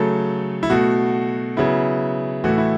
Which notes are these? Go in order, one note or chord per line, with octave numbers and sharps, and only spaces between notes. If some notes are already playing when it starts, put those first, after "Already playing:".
Already playing: C#3 F#3 A3 A4
E4
B2 A3 F#4
C#3 F#3 B3 E4
A2 E3 A3 F#4
E4